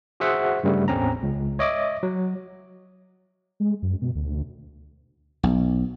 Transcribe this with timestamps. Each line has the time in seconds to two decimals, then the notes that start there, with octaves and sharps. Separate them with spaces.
0.20 F#4 G#4 C5 E5 F#5
0.64 G2 C#3 G3 A3
0.88 A1 E2 C4 C#4 A#5
1.23 C#2
1.59 C#5 D#5 E5 D6
2.03 F#3
3.60 G#3
3.82 F#2
4.02 B2
4.15 D2
5.43 B1